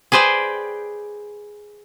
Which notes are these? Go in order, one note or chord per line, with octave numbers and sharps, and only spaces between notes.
G#4 B4 C5 D5 G5